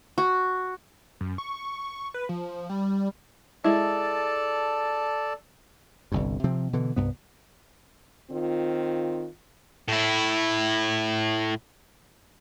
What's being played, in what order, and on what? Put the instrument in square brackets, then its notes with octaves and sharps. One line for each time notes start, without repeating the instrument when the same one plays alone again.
[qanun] F#4
[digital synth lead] F#2
C#6
C#6
B4
F3
G3
[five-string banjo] G#3 E4 [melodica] A4 D5 A5
[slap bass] G1 C2 G2
C3 F3 C4
B2 D3 E3
C2 G2 B3
[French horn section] D#3 C4 F4
[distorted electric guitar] A2 E4